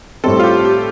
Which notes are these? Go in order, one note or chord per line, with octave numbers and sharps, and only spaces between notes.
A2 G3 C4 A4
F4
G4
G4